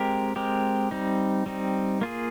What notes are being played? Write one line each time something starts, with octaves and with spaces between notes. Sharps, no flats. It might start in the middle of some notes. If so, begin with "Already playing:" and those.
Already playing: G#3 C4 G4 A#4
G#3 C4 G4 A#4
G3 C4 D#4
G3 C4 D#4
A#3 F4 G#4